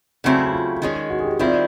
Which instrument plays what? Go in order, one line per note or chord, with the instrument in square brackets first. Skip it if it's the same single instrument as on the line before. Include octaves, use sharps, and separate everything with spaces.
[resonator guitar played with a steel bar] C#3 F#3 A3 C4 E4 [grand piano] F#4
[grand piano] F#4
F4
[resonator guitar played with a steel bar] D#3 G#3 C#4
[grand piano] F#4
G#4
G4
[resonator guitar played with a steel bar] D#3 G3 C4 E4 [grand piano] F4